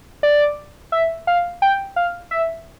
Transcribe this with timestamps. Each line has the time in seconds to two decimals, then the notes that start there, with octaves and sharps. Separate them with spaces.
0.23 D5
0.92 E5
1.27 F5
1.62 G5
1.96 F5
2.31 E5